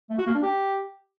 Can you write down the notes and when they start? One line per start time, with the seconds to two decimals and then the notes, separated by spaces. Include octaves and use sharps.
0.10 A3
0.18 F#4
0.26 A#3
0.34 D4
0.43 G4